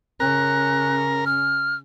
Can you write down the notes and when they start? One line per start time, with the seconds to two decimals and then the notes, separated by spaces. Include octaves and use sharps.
0.20 C#3 C#4 A#4 F#6
1.26 F6